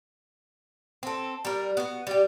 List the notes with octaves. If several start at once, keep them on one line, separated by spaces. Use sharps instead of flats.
C4 A4
G3 A#4
B3 F#4
G3 G4